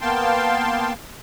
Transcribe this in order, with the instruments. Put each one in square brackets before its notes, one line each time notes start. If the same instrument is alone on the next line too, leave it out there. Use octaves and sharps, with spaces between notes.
[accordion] A#3 B3 F5 G5 A5 C6